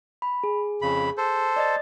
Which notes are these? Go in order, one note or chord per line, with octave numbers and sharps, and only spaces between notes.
B5
G#4
F2 C#3 B5
A4 C5
D5 D#5 A6